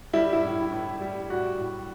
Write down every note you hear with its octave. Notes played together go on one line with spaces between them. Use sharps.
G3 E4
E4
A2
A2
G3
G3 F#4
A2